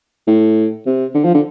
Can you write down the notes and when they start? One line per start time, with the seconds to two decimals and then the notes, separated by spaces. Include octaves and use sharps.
0.28 A2
0.86 C3
1.15 D3
1.25 F3
1.35 D3